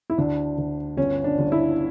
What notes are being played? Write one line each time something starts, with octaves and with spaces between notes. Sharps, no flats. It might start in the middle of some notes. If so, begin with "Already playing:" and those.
E4
D2 D4
D2
G1 C#4
D4
G1
E4